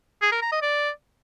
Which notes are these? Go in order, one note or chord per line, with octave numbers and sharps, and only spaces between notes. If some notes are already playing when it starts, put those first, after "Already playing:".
G#4
A#4
A#5
D#5
D5